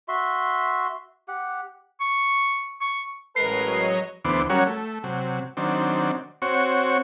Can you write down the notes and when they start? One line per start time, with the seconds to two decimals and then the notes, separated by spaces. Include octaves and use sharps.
0.08 F#4 E5 C6
1.28 G4 F#5
2.01 C#6
2.81 C#6
3.36 A1 F#3 G#3 A#4 B4 C#5 D#5 C7
4.25 D2 E3 B3 C5 D6
4.50 F#3 G3 C#4 F#4 A#4 C#5
4.67 A3
5.04 C3 F#3
5.57 D#3 F#3 C4 D4
6.42 C4 F#4 C#5 C#6